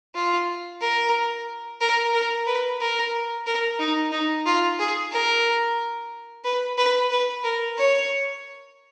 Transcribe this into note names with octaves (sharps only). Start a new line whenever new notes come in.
F4
A#4
A#4
A#4
B4
A#4
A#4
D#4
D#4
F4
G#4
A#4
B4
B4
B4
A#4
C#5